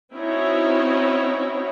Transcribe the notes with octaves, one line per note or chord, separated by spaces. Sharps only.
C4 C#4 D#4 E4 F#4 C#5